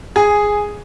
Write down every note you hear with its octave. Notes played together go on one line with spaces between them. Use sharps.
G#4